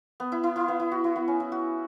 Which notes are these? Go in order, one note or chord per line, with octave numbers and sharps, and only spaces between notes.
B3
E4
E4
E4
B3
E4
F#4
E4
B3
C#4
E4
F#4